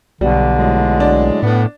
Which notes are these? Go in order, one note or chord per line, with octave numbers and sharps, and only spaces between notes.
B1 D3 G3
A2 F#3 G#3
D4
A2 B3